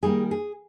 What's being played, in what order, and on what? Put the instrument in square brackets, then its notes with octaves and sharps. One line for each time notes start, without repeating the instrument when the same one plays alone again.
[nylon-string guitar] D#3 G3 A#3 G#4
G#4